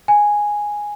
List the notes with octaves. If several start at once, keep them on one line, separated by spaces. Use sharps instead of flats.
G#5